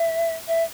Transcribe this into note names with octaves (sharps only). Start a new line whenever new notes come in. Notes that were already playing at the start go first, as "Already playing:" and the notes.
Already playing: E5
E5